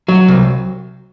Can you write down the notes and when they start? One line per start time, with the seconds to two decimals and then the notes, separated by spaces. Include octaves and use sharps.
0.08 F#3
0.28 C2